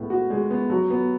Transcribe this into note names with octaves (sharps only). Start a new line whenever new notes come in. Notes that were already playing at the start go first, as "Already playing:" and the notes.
Already playing: A2 G#3 B3
F#4
G#3
B3
F#3
B3